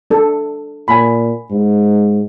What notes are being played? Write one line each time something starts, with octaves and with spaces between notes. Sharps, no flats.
D4 A4
A#2 G#5 B5
G#2